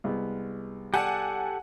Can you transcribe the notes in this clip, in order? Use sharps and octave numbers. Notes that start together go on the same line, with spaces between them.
C2 G#3 B3
G4 A4 D5 F#5 G#5